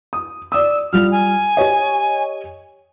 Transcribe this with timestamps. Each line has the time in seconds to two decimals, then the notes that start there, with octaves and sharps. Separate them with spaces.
0.13 D#6
0.52 D5 D#6 E6
0.93 G3 F4 F6
1.12 G#5
1.57 G4 C#5 D#5